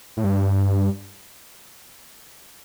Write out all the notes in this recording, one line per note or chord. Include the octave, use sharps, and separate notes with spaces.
A2
G2